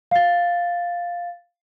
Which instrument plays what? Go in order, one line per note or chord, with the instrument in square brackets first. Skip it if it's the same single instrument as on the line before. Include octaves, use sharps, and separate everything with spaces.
[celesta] F5 A6